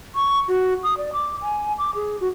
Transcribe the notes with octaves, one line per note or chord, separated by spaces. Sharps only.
C#6
F#4
D#6
D5
D6
G#5
D6
G#4
F#4